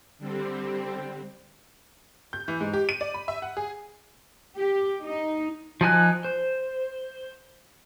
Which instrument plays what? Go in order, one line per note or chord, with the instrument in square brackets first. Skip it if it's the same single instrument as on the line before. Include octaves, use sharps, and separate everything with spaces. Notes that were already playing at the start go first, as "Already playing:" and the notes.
[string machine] D3 G3 C4
[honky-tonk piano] G6
E3
G#2
G4
D#7
D5
B5
E5
F#5
G#4
[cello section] G4
D#4
[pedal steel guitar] F3 D#4 G#5 F#6
C5